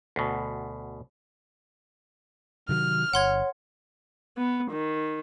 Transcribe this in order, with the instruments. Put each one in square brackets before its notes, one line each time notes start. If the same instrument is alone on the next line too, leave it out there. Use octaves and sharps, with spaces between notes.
[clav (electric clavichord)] D2 B2
[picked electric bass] C3 D#3 F#3 [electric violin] F6
[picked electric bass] G1 [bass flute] C#5 [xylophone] F#5 C6 G#6
[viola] B3
D#3